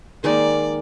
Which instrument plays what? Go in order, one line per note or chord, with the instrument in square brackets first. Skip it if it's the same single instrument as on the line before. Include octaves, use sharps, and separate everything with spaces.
[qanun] D#3 G#3 A#3 [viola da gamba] D5